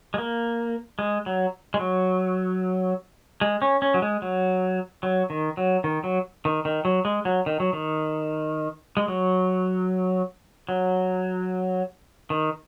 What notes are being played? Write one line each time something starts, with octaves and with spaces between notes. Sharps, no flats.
G#3
A#3
G#3
F#3
G#3
F#3
G#3
C#4
C#4
F#3
G#3
F#3
F#3
D#3
F#3
D#3
F#3
D#3
D#3
F#3
G#3
F#3
D#3
F#3
D#3
G#3
F#3
F#3
D#3